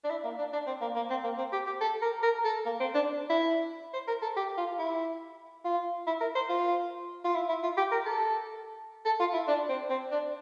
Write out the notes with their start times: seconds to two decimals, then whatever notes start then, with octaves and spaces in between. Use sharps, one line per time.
0.04 D4
0.10 E4
0.24 A#3
0.38 D4
0.53 D4
0.67 C4
0.81 A#3
0.95 A#3
1.10 C4
1.24 A#3
1.38 C4
1.52 G4
1.66 G4
1.81 A4
2.02 A#4
2.23 A#4
2.45 A4
2.66 A#3
2.80 C4
2.95 D4
3.30 E4
3.93 C5
4.07 A#4
4.22 A4
4.36 G4
4.58 F4
4.79 E4
5.64 F4
6.07 E4
6.21 A#4
6.35 C5
6.49 F4
7.25 F4
7.35 E4
7.49 E4
7.63 F4
7.77 G4
7.91 A#4
8.06 A4
9.05 A4
9.19 F4
9.33 E4
9.47 D4
9.69 C4
9.90 C4
10.11 D4